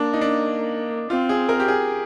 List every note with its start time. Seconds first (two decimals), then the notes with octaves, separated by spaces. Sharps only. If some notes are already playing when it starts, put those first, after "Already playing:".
Already playing: A#3 D4
0.13 D#4
0.21 D4
1.10 C4 F4
1.29 G#4
1.49 A#4
1.60 G4
1.68 G#4